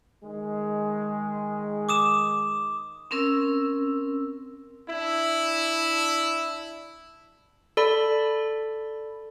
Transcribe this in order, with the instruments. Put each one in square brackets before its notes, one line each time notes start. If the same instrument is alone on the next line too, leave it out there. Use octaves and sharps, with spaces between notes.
[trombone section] D#3 G#3
[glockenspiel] D6 D#6 E7
[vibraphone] C4 C#4 A#4 E6
[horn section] D4 E4
[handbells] A4 D5 B5